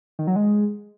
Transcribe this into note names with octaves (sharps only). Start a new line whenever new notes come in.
D#3
F#3
G#3